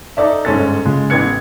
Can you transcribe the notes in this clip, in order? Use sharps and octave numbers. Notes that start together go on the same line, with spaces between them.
D#4 A4 D5 E5
G1 G#2 G#3 C#4 A4 A6
C#3 G#3 F4
A1 B3 G#6 C#7